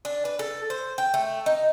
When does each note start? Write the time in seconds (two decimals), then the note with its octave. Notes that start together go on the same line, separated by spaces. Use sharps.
0.05 D4
0.25 B4
0.39 A4
0.70 C5
0.98 G5
1.14 A3
1.46 D#4